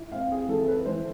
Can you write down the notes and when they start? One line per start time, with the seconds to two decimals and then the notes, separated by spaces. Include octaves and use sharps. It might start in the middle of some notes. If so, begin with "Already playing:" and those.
Already playing: E4
0.12 C4 F5
0.31 G#4
0.49 E3 A4
0.63 A4
0.68 B4
0.86 E3 C5